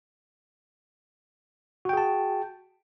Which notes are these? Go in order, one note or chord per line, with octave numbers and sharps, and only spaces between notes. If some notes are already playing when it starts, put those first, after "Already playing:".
F#4 G#4 G5 A5